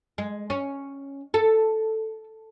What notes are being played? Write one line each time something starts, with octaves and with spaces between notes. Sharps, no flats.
G#3
C#4
A4